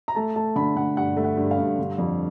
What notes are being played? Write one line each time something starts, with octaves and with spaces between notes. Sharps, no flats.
A#5
A3 A5
A3 A5
D3 B5
D3 F#5
G2 F#5
A3
F#5
G2
F5
G2
D3
F2